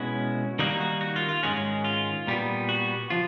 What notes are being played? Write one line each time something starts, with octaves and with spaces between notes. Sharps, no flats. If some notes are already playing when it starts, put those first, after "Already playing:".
Already playing: B2 G#3 C#4 E4 F#4
D#3 G3 A#3 D#4 F#4
F#4
F#4
F4
F4
G#2 D#3 G#3 C#4 F#4
F4
A#2 G3 B3
F#4
F3 F4